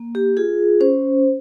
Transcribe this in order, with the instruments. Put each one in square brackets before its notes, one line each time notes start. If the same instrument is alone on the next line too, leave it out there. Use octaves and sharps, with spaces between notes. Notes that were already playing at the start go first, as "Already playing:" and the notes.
Already playing: [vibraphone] A#3
G4
F4 G#4
C#4 C5